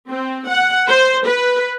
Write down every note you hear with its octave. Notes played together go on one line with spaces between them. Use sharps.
C4
F#5
C5
B4